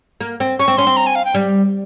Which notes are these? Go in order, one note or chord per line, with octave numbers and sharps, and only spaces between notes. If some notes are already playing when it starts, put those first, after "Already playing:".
A#3
C4
C#4 C#6
C4
C#4 C6
C4
A#5
G#5
F5
G5
G3